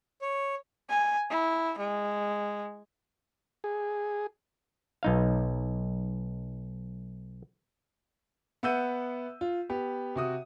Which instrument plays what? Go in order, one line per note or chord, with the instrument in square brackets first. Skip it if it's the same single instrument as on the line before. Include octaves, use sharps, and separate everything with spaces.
[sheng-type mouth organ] C#5
[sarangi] G#5
E4
G#3
[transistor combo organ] G#4
[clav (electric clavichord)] B1 D#4 F5
[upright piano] B3 E5 F#5 E6 G6 D#7
F4
B3 G4
C3 F#4 D#6